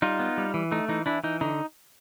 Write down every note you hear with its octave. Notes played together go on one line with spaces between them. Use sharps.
G3 D#4 F4
B3
G3
E3
A3 D#4
E3 D#4
E3 D4 E4
E3 D#4
D3 D#4